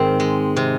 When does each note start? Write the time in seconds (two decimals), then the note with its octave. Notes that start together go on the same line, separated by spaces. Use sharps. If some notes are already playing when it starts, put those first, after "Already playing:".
Already playing: G#2 D#3 C4
0.20 G#3
0.57 C3